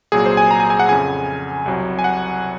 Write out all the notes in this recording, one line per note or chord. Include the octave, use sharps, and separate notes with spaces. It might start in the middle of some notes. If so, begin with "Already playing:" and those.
C2 A#2 F#3 G#4
C5
G#5
A#5
G#5
G#5
F#5
F2 C#3 F3 G#5
C2 C3 F#3
G#5
F#5